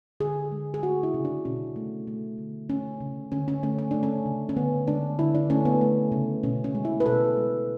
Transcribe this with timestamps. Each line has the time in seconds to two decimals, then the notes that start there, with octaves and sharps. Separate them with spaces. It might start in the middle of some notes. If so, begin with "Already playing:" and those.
0.20 D3 G#4
0.52 G#3
0.74 G#4
0.83 A3 F#4
1.03 E4
1.14 C#3
1.25 D4
1.45 B2 C#4
1.76 A3
2.07 A3
2.38 D3
2.69 A3 C#4
3.00 C#3
3.32 D3 C#4
3.48 C#4
3.63 A3 C#4
3.79 C#4
3.91 A3 D4
4.03 C#4
4.26 C#3
4.49 C#4
4.56 D3 B3
4.88 G#3 D4
5.19 D3 E4
5.35 D4
5.50 A3 C#4
5.65 B3
5.81 A3
6.12 C#3
6.43 B2 C#4
6.64 C#4
6.75 G#3
6.85 E4
7.00 B4
7.06 B2 A4
7.37 G#3